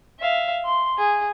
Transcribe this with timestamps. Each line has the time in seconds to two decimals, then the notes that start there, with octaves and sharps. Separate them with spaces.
0.19 E5 F5
0.65 C6
0.97 G#4